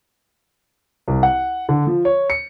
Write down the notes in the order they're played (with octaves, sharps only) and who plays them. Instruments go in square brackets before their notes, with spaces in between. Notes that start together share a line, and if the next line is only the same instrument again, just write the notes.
[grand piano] C2
F#5
D3
F3
C#5
C#7